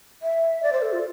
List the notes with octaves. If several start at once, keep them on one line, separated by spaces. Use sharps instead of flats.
E5
D5
C5
A4
F4